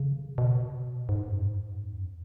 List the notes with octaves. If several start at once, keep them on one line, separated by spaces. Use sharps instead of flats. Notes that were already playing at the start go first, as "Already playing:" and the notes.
Already playing: C#3
B2
G#2
F#2
G#2
E2
F#2